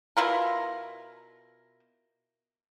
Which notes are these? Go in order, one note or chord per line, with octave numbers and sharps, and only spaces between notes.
B2 E4 F4 A#4